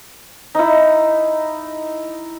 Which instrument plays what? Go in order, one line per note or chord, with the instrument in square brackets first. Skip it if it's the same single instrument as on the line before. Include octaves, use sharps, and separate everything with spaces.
[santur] D#4 E4